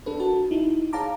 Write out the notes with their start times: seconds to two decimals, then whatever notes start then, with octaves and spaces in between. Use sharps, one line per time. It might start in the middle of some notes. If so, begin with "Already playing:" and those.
0.06 D4 A4 B4
0.20 F#4 A#4 A5
0.51 D#4 E4
0.93 G#4 C#5 F5 A5 A#5 D6